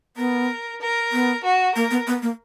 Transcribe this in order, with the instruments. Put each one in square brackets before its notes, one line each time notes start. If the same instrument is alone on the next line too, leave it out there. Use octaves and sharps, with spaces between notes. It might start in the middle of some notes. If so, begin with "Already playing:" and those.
[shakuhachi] B3 [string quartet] A#4
[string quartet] A#4
[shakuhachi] B3
[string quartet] F#4
[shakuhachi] A#3 [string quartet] A#4
[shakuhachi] B3
B3
A#3